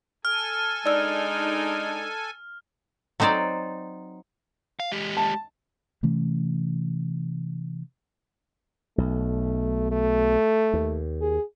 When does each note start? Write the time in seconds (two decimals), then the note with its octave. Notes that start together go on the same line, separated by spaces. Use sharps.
0.25 A4 G#5 F6
0.86 G#3 D4 D#4 D5 E6
3.20 F#3 C4 D#4 C5 D5
4.80 F5
4.92 G#3 G4
5.17 A5
6.03 C3 E3 A3 C#4
8.98 B1 A3
9.91 A3
10.73 D#2
11.22 G#4